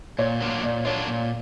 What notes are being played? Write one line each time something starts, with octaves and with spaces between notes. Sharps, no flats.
A#2 C#5
F#3 A#3 D4 F4
A#2 D5
F#3 A#3 D4 F4 C#5
A#2